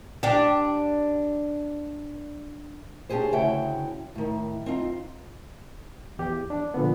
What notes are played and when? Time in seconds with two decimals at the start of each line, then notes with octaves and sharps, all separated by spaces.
0.23 D4 G4
3.09 C#4 D4 G4 G#4 C5
3.33 D2 C#3 E4 F#4 C#5 G5
4.15 A2 D#3
4.66 C4 D#4 F4
6.19 E2 G4
6.50 D4
6.74 A#2 D3 F3 B3